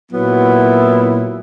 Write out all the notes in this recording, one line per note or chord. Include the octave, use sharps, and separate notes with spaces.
A#2 F#3 B3 E4